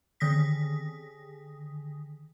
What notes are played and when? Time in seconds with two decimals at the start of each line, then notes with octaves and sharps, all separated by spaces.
0.20 D3 D#3 D#6 A#6 B6